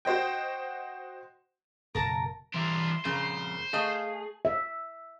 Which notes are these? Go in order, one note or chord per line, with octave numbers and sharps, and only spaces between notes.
F#4 C5 D#5 G5
F#1 B2 A#4 A5 A#5
E3 G3 D4 A#4 E5 C6
F2 C#3 A#4 C5
A3 G#4 D#5 F5
E5